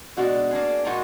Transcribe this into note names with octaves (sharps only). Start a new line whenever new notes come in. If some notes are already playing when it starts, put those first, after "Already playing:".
B2 G#3 D4 F#4
A#3 D4 G#4
A#2 G#3 D#4 F#4 A#4